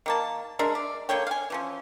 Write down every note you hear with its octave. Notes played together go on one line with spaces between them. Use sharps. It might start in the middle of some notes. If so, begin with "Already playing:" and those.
D#3 A#3 A5
G#3 D4 A#4 E5
D5
D3 A#3 C#5 G5
F5 G#5
E3 F3 C#4